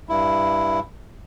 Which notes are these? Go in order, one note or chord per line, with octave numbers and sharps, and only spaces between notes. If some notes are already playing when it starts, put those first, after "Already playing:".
G2 E4